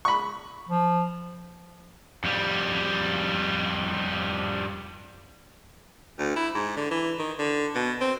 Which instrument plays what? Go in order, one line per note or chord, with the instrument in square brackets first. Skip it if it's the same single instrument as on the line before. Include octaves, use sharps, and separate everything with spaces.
[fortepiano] B5 C#6
[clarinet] F3
[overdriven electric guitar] F2 G3
[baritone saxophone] D2
E4
G#2
D3
E3
D#3
D3
B2
C4